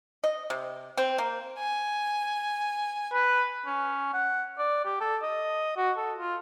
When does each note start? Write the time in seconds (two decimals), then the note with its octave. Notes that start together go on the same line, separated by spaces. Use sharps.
0.24 D#5
0.50 C3
0.97 C4
1.18 A#3
1.59 G#5
3.13 B4
3.66 C#4
4.13 F#5
4.58 D5
4.85 G4
5.01 A4
5.22 D#5
5.77 F#4
5.97 A4
6.19 F4